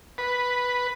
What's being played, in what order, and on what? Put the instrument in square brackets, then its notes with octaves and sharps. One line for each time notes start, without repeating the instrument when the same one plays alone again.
[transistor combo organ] B4